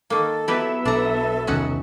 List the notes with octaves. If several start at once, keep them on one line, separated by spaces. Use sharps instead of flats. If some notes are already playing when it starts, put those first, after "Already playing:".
D#3 A#3 A4
F#3 B3 E4 G4 B4 E5
B1 D4 A4 A#5
E1 C2 D#3 C#4 D#4 F#4